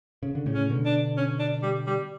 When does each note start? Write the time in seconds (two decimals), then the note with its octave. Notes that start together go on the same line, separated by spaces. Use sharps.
0.23 C#3
0.35 D3
0.46 A2 C#3
0.55 C#4
0.70 B2 D3
0.85 D4
1.17 C#4
1.40 D4
1.63 G3
1.87 G3